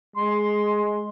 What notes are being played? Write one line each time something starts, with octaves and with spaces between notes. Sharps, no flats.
G#3 C6